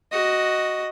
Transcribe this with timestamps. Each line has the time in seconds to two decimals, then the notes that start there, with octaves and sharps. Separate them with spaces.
0.12 F#4 D#5